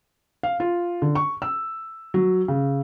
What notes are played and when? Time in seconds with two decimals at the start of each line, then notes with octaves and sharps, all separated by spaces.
0.43 F5
0.60 F4
1.02 D3
1.15 C#6
1.42 E6
2.14 F#3
2.48 C#3